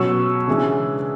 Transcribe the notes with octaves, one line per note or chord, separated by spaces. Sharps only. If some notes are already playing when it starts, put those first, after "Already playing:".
Already playing: B2 F#3 C#4 C#6 E6
C#3 E3 G#3 D4